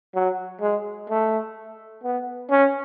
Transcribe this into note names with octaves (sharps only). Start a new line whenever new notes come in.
F#3
G#3
A3
B3
C#4